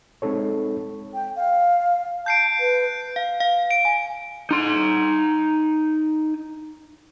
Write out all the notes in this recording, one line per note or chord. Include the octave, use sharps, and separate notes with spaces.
G#3 C4 D#4 A4 C#5
G5
F5
A5 G6 C7 D7
B4
F5
F5
D7
G#5
D#4 C6